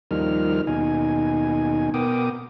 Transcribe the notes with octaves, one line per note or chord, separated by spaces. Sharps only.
D#2 F3 G3 D#4 A#4 F6
D#2 B2 D#4 G#5
B2 B3 A#4 G5 D6 D#6